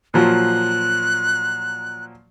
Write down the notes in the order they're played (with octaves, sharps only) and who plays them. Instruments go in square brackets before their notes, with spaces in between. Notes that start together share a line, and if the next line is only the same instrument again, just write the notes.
[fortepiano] A#2 F3 F#3 [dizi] F#6